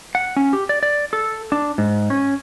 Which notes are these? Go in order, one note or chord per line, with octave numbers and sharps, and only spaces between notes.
F#5
C#4
G4
D5
D5
A4
D4
G#2
C#4